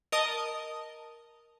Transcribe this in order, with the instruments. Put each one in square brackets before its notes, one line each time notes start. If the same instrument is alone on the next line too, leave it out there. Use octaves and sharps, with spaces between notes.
[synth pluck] A#4 D#5 A5 D#6